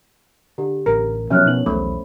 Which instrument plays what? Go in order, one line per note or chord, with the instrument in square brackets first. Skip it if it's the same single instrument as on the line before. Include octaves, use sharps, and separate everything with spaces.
[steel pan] D3 [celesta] G4
[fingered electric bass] A1 [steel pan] A#4
[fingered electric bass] C3 F#3 B3 [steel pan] F3 C#4 [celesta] E5 F6 F#6
[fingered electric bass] B2 B3 [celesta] D#4 E4 F#7
[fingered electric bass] B1 E2 [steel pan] A3 [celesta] C5 B5